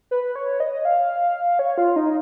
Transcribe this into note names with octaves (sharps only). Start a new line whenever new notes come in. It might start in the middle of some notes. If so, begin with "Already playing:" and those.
B4
C#5
D#5
F5
C#5
F4
D#4